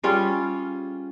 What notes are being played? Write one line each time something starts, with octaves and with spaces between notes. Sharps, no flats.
G3 C#4 F4 G#4